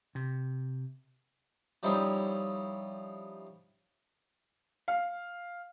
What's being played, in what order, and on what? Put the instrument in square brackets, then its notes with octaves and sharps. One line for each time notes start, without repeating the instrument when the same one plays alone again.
[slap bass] C3
[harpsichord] F3 G3 C#4 D#4 E4 C5
[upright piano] F5